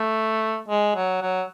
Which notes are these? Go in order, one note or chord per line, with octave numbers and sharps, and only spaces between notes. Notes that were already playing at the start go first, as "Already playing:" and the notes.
Already playing: A3
G#3
F#3
F#3